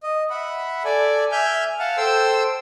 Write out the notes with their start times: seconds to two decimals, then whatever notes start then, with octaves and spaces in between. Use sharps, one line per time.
0.03 D#5
0.30 E5 F#5 B5
0.85 A4 D5 G#5
1.32 E5 G#5 F6 G6
1.79 F5 F#5 A5
1.97 A4 C5 G5 C6 E6